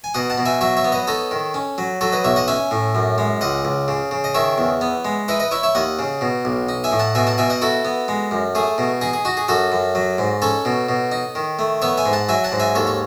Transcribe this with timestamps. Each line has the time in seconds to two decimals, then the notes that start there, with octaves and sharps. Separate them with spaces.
0.04 G#5
0.14 B2 D#5 F#5
0.30 F#5 A5
0.38 B2
0.45 E5 G#5
0.61 F#3 C#5 E5
0.77 C#5 E5
0.84 B3
0.92 B4 D#5
1.07 D#4 A4 C#5
1.31 D#3
1.54 C#4
1.78 F#3
2.01 F#3 A4 C#5
2.13 B4 D#5
2.24 B1 C#5 E5
2.36 D#5 F#5
2.48 C#4 E5 G#5
2.71 A2
2.95 F#2
3.18 G#3
3.41 C#2 D#5 F#5
3.65 C#2
3.88 C#3
4.11 C#3
4.24 D#5
4.34 D#3 C#5 E5
4.58 E2
4.81 B3
5.05 G#3
5.28 E4 B4 D#5
5.40 B4 D#5
5.51 E4 C#5 E5
5.63 C#5 E5
5.75 D#2 D#5 F#5
5.99 C#3
6.21 B2
6.45 B1
6.69 D#4
6.84 E5 G#5
6.91 A2
6.99 F#5 A5
7.15 B2 E5 G#5
7.27 F#5 A5
7.38 B2 E5 G#5
7.50 D#5 F#5
7.62 E4 F#4 A4
7.85 B3
8.08 G#3
8.31 F#2
8.55 A3 G#4
8.78 B2
9.01 D#4 G#4
9.13 G#4
9.25 D#4 F#4
9.37 G#4
9.48 F#2 F#4 A4
9.72 F#2
9.95 F#3
10.18 G#2
10.42 C#4 A4 C#5
10.65 B2
10.89 B2
11.12 D#4
11.35 D#3
11.59 A3
11.82 B3 C#5 E5
11.97 E5 G#5
12.06 G#2
12.13 F#5 A5
12.29 F#3 E5 G#5
12.44 F#5 A5
12.52 G#2
12.60 E5 G#5
12.75 D#2 A4 C#5
12.87 C#5